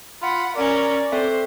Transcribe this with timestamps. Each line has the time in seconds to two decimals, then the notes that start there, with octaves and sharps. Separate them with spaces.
0.22 F4 F#5 B5
0.56 C#4 A#4 D5
1.12 C4 A4 C5 E5